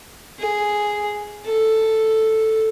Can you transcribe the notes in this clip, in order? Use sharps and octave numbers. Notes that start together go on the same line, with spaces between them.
G#4
A4